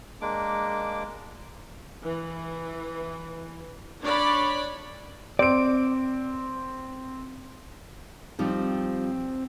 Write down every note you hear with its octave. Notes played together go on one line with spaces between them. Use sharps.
G#3 A#3 D4 D6
E3
D4 C#5 D5 B5
C4 D5 D7
F3 G3 C4 D#4